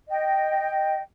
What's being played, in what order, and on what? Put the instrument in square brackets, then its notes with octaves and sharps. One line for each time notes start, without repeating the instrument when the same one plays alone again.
[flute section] D#5 G5